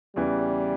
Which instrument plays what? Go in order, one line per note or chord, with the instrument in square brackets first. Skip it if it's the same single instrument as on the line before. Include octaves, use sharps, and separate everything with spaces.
[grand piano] E2 C#3 E3 [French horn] G3